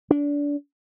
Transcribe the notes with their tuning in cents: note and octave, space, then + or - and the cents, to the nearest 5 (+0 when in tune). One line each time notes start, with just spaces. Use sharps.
D4 -25